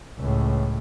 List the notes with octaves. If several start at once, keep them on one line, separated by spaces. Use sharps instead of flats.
C#2 A2